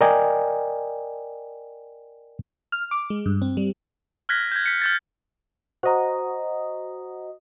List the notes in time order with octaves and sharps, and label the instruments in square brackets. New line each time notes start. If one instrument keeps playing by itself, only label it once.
[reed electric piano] A#4 D5 D#5 G5 G#5
[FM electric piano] F6
D6
G#3
G2
C4
G3
[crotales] F6 F#6 G#6 A#6 B6
G6 G#6
B6 C#7
F6 G6 A6
[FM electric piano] F#4 D#5 [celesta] C5 A#5